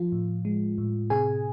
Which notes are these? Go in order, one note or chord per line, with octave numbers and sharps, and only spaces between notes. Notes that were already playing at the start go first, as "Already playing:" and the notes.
Already playing: F3 F4
A2
G#3
A2
C3 G#4 G#5